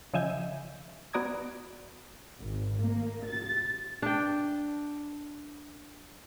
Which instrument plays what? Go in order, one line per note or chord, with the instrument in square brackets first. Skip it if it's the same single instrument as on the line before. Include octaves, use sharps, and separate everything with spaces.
[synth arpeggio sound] C#3 F3 D#5 E5 G#5 G6
B3 F#4 D5 A#5 D#6 G#6
[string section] G#1
A#3
A6
[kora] D4 G5